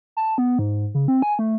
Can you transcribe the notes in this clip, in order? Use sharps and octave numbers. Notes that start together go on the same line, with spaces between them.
A5
B3
G#2
C#3
C4
G#5
A3